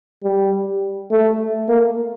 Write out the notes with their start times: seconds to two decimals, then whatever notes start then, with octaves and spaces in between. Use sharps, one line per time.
0.24 G3
1.11 A3
1.69 A#3